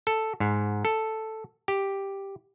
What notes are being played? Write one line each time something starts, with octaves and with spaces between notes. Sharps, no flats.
A4
G#2
A4
G4